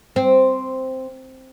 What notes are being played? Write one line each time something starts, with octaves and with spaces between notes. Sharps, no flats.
C4